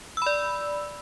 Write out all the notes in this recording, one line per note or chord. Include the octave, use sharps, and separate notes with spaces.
D5 B5 E6